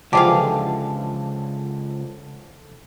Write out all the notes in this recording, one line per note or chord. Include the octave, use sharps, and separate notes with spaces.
C#2 D3 E3 F3 G4 G#4 F5 A5